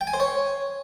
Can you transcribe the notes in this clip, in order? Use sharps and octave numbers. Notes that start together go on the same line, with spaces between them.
G5
G#5
C5
C#5